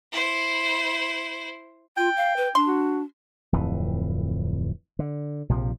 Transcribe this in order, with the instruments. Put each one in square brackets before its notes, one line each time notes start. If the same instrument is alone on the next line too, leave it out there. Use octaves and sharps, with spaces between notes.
[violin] E4 C5
[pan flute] F4 [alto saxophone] G5
[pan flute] F5
B4
[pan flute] D4 [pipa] C6
[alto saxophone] F#4
[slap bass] D1 F2 E3
D3
A#1 C3 F3